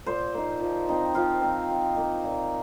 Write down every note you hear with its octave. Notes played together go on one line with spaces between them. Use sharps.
A#2 C5
A#3 D#4
F3
C4 D#4
F3 F4
C4 D#4
F3
A#3 D#4
A#2